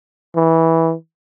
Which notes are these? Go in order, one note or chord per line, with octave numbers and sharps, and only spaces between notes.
E3